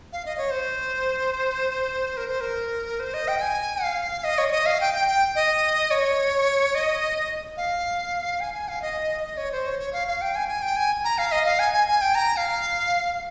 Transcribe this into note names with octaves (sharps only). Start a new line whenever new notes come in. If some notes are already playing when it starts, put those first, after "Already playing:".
F5
D#5
C#5
C5
A#4
C5
A#4
C5
D#5
G5
G#5
F5
D#5
C#5
C#5
D#5
F5
G5
G5
G5
D#5
C#5
D#5
F5
G#5
G#5
F5
D#5
D#5
C#5
C5
C#5
C#5
F5
F5
G5
G#5
G#5
G5
G#5
A#5
F5
D#5
F5
G#5
G#5
G#5
G5
A#5
F5